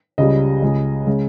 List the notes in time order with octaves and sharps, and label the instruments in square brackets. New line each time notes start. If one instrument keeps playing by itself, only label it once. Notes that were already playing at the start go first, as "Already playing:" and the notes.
[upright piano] C#2 C#3 G3 D#5
C#2 C#3 G#3
C#3 G#3